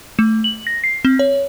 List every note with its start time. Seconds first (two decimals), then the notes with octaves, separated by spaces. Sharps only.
0.19 A3
0.44 F#7
0.67 A#6
0.84 C7
1.05 C4
1.19 C#5